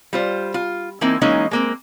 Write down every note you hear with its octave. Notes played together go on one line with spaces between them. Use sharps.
G3 F4 C5
F4
E3 A#3 C4 D#4 E4
E3 F#3 G#3 A#3 C#4 D#4
G#3 A#3 C4